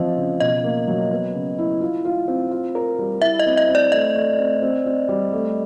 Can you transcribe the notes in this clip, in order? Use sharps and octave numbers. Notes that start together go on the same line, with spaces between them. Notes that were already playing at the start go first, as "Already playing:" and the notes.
Already playing: F3 C4 D#5
C#3
B2 D#5
A#3
F#3
B3
C#3
E4
F4
F4
C4
F4
A#4
G3
E4 E5
D#5
C4
D#5
C4
D5
A3 D#5
A3
C4
C4
C4
G3
A3